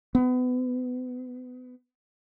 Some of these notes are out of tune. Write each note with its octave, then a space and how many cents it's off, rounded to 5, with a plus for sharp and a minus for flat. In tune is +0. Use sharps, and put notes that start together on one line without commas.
B3 +30